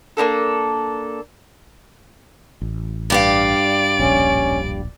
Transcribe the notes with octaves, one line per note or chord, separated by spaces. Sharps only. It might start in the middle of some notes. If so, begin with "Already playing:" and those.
A#3 C#4 D4 A4
A1
G2 G4 D5 F5 D7
D1 A#1 C#4